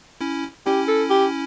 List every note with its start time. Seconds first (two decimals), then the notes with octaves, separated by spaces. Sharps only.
0.21 C#4 E4
0.66 C#4 E4 G4
0.88 A4
1.10 G4